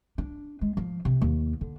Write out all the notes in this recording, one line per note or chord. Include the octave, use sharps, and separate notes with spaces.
D4
G#3
F3
C3
D#2
D3